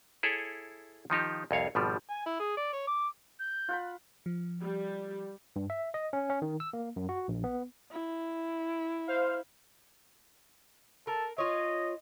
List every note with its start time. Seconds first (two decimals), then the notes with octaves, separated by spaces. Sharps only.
0.23 E4 G#4 A4 C#5 E5
1.10 D#3 F3 D#4 G4
1.51 C2 F2 C#5 F5
1.75 G#1 B2 F3 G3
2.10 G#5
2.26 E4
2.40 G#4
2.57 D5
2.73 C#5
2.87 D6
3.39 G6
3.68 F4 F#5 B5
4.26 F3
4.61 G3
5.56 G2
5.70 E5
5.94 D#5
6.13 C#4
6.30 C#4
6.42 D#3
6.60 E6
6.73 A#3
6.96 F#2
7.09 F#4
7.28 A#1
7.44 B3
7.92 E4
9.07 C5 F5
11.07 A4 A#4
11.38 F4 C#5 D#5